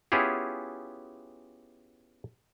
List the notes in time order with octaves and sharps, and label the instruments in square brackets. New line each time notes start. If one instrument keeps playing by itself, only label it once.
[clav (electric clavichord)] B3 C#4 E4 F4 G4 G#4